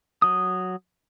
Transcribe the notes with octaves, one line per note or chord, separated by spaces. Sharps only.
F#3 D#6